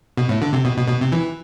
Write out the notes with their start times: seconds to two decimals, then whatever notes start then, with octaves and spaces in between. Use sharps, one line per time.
0.17 B2
0.29 A2
0.42 D3
0.53 C3
0.65 B2
0.77 B2
0.88 B2
1.01 C3
1.12 E3